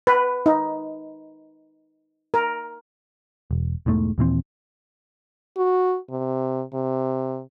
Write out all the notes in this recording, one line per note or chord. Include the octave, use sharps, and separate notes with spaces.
B4
D#4
A#4
E1
E1 E2 G#2 A3
D#2 A#2 E3 C4
F#4
C3
C3